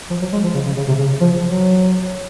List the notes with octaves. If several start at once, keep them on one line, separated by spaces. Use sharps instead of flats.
F3
F#3
G#3
F3
C#3
C#3
C#3
C3
C#3
F3
F#3